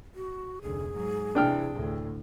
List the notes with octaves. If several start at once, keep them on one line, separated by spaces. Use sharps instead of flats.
F#4
F1 D2 G#4
G#2 F#3
C3 E3 D4 G5 F6
D2 A2